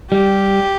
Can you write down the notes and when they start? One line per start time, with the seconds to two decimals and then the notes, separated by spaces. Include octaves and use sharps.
0.11 G3 G4